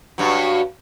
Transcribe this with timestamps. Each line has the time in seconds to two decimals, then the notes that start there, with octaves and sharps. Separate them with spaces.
0.18 G2 F#3